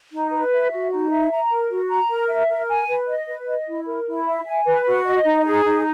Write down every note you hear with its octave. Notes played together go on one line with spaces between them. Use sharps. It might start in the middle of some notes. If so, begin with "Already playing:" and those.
D#4
B4
E5
F#4
D#4
E5
A#5
A#4
F#4
A#5
A#4
E5
A#4
G#5
B4
D#5
B4
D#5
E4
A#4
E4
E5
G#5
B4
F#4
D#5
D#4
G#4
D#4